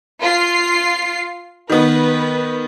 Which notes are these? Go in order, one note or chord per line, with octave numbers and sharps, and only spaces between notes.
F4 C7
D#3 B3 B4